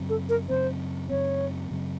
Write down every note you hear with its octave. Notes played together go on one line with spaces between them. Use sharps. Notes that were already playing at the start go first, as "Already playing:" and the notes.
Already playing: F#2 C#3 F#3 C4
A4
A#4
F#2 C#3 F#3 C4 C5
F#2 C#3 F#3 C4 C#5
F#2 C#3 F#3 C4